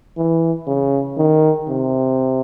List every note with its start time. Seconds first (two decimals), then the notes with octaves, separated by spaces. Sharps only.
0.17 E3
0.67 C#3
1.17 D#3
1.68 C3